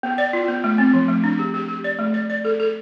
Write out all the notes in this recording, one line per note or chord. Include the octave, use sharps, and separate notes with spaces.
B3
D5
F4
B3
A3
C4
F3
A3
D4
G4
G4
G4
D5
A3
D5
D5
A4
A4